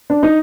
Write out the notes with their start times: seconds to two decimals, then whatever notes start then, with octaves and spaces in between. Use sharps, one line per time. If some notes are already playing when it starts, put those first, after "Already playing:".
0.10 D4
0.23 D#4